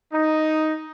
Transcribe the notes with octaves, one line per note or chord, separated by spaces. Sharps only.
D#4